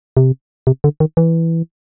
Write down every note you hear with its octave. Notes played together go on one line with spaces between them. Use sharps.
C3
C3
D3
D#3
E3